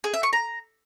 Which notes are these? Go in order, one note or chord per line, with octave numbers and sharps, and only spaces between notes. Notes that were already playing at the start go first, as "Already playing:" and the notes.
G#4
E5
C#6
A#5